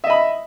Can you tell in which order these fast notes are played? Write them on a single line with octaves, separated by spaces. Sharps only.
E5 D#5 B5